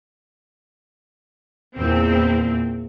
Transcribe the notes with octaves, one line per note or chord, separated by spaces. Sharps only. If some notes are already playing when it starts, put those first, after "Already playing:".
E2 A#2 C4